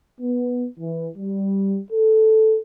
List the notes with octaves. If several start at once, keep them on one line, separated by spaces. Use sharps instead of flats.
B3
E3
G3
A4